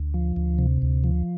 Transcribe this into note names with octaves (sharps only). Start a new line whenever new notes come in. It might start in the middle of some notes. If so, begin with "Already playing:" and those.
Already playing: D2
F3
D2
C3
D2
F3